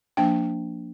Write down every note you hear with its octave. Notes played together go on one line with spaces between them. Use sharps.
F3 A#3 D4 G5